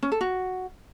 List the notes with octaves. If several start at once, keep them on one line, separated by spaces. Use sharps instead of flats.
C#4
A4
F#4